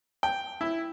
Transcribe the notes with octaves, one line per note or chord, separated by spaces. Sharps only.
G5
E4